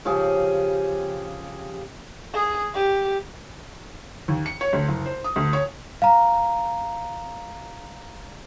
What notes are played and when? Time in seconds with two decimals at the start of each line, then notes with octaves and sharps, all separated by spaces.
0.05 C#3 F3 G4 G#4
2.34 G#4
2.74 G4
4.28 D#2
4.46 C#7
4.61 C#5
4.73 D2
4.88 F#1
5.06 C5
5.24 D#6
5.36 D2
5.53 C#5
6.02 F5 A#5